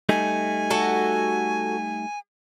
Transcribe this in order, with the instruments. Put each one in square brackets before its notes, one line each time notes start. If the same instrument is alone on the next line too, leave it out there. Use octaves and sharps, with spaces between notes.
[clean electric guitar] G3 A3 D#4 [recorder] G#5
[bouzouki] F#4 A4